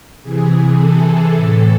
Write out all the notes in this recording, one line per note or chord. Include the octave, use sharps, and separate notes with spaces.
C3 E3 G#4
A4
A2 E3 A4